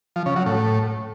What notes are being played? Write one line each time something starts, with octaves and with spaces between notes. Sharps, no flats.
F3
C#3
F#3
A2